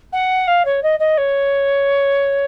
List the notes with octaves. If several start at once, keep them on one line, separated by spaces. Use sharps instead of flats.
F#5
F5
C#5
D#5
D#5
C#5